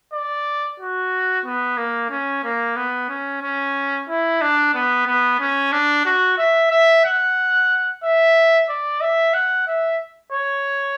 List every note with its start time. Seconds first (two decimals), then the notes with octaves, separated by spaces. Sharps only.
0.13 D5
0.80 F#4
1.45 B3
1.78 A#3
2.11 C#4
2.44 A#3
2.76 B3
3.10 C#4
3.42 C#4
4.09 E4
4.42 D4
4.75 B3
5.07 B3
5.40 C#4
5.72 D4
6.06 F#4
6.38 E5
6.71 E5
7.05 F#5
8.04 E5
8.69 D5
9.01 E5
9.34 F#5
9.67 E5
10.32 C#5